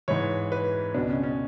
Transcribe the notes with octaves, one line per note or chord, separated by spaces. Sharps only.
G#2 E3 C#5
B4
C#2 B2 D4
C#4
C#4